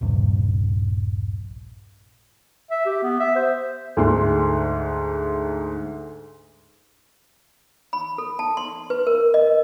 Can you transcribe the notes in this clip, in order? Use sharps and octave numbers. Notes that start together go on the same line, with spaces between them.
D#1 A#1 G2 C3
E5
G4
B3
E5
C5
D2 G#2 C6
B5
A4
A5
C6
B4
A#4
D#5